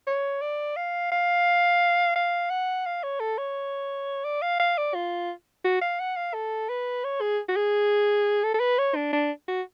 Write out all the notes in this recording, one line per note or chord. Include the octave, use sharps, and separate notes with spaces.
C#5
D5
F5
F5
F5
F#5
F5
C#5
A4
C#5
D5
F5
F5
D5
F4
F#4
F5
F#5
F5
A4
B4
C#5
G#4
F#4
G#4
A4
A4
B4
C#5
D4
D4
F#4